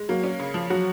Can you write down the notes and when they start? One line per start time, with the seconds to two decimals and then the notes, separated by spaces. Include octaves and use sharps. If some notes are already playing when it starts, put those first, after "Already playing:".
Already playing: G#3
0.09 F#3 A#3
0.24 C#4
0.40 C#3
0.54 F3
0.70 F#3 F#4